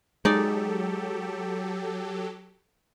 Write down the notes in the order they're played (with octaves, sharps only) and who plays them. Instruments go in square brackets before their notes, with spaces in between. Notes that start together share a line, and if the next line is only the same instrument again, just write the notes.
[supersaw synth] F#3 G4 A4 [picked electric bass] G#3 [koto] D#4 D5